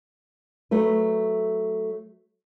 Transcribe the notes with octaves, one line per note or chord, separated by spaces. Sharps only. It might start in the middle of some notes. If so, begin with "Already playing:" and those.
F#3 A3 B4